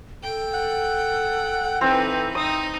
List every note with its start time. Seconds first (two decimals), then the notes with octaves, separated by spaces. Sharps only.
0.23 A4 G5
0.54 F#5
1.81 E3 C4 D#4 B4
2.35 D#4 D#6